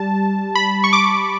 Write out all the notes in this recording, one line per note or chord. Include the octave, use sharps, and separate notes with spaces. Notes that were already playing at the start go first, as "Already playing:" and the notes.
Already playing: G3 A5
B5
C#6
D6